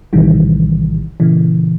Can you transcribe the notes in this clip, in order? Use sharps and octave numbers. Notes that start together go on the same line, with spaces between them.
A#1 A2 C3 D#3 E3 G3
A#2 C#3 E3